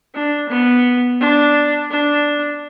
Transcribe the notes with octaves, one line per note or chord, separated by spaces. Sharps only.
D4
B3
D4
D4